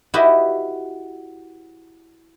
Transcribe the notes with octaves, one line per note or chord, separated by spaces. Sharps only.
E4 F#4 G4 B4 D#5